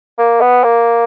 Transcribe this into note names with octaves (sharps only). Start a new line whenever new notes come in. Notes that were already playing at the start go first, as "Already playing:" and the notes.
A#3
B3
A#3